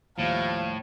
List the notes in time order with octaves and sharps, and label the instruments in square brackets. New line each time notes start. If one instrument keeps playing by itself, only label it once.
[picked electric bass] D#2 [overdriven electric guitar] A2 [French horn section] F3 G3 [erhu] F5